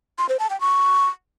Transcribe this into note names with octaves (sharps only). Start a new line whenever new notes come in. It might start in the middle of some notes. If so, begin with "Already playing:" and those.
C6
C5
A5
G5
C#6